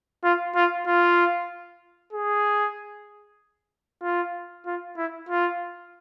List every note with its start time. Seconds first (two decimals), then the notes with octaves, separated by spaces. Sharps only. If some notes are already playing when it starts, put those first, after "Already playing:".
0.24 F4
0.56 F4
0.87 F4
2.13 G#4
4.03 F4
4.66 F4
4.97 E4
5.29 F4